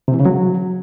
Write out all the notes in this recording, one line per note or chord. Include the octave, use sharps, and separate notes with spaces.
C3
E3
C#3
F#3